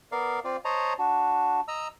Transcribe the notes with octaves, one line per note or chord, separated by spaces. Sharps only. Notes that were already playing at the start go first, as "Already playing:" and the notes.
B3 A#4 D5 F5
C4 F4 D5
C5 C#5 D#5 A5 A#5
D4 F#4
D#5 A#5 E6